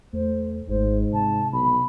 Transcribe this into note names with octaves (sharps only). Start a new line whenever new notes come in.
E2 A3 C5
G#1 G#2 C5
C3 A5
B1 B5